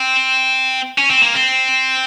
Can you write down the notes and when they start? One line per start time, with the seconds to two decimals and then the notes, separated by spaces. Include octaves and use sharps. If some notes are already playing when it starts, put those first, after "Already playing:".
Already playing: C4
0.98 C#4
1.10 C4
1.22 A#3
1.34 C4